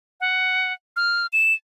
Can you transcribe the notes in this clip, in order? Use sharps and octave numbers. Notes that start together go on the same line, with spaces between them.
F#5
F6
E7